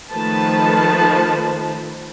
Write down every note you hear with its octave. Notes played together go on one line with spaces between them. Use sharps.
D#3 F3 A3 B4 C5 A5